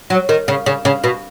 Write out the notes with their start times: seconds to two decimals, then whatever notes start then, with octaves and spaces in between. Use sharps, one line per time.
0.10 F#3
0.29 D#3
0.48 C#3
0.66 C#3
0.85 C#3
1.04 B2